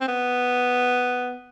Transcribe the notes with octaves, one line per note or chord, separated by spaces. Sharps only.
C4
B3